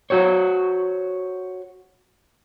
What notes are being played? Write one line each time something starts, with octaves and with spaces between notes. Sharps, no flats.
F#4 C5 C#5